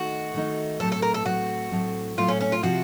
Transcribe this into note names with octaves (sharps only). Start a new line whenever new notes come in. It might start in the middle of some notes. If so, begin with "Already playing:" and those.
Already playing: D#3 A3 D#4 F#4
D#3 A3 D#4
A2 F#3 A3 C4 A4
A4
A#4
A4
A2 F#3 A3 C4 F#4
A2 F#3 A3 C4
A2 F#3 A3 C4 F4
C#4
C#4
F4
C3 F3 C4 F4 F#4